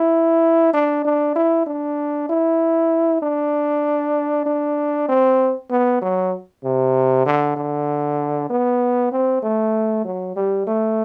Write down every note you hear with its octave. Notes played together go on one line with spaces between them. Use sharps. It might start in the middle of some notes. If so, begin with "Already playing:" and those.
Already playing: E4
D4
D4
E4
D4
E4
D4
D4
C4
B3
F#3
C3
D3
D3
B3
C4
A3
F#3
G3
A3